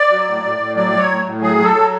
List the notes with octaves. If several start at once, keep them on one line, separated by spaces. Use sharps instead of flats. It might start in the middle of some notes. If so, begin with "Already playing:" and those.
Already playing: D5
F#3
A2
A2
A2
F#3 D5
F#3
C#5
A2
A2
F#3 G#4
F#3
A4
F#3